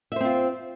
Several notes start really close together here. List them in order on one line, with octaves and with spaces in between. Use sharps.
E5 C5 C4 F4